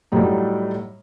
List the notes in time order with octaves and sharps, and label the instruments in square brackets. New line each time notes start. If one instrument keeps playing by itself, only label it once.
[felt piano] A2 F#3 G3 D#4